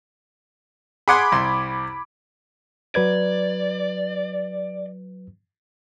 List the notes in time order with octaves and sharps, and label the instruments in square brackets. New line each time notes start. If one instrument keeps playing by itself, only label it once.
[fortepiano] G#4 F#5 C6 [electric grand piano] B5 D6 G#6
[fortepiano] C2 C6
[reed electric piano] F#3 B4 G#6 [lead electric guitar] D5